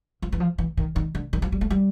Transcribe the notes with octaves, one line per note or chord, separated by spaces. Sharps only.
F3
E3
F3
E3
D#3
D#3
D3
D#3
F3
G3
A3
G3